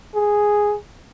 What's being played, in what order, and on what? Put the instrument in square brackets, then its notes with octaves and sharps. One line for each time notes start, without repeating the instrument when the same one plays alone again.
[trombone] G#4